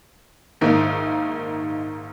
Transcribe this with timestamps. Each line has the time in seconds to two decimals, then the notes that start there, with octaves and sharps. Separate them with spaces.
0.61 A#1 G#2 D#3 A#3 D#4